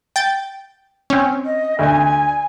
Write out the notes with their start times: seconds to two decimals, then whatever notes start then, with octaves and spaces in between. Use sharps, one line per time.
0.16 G5 A6
1.10 C4 C#4
1.46 D#5
1.79 D2 G#5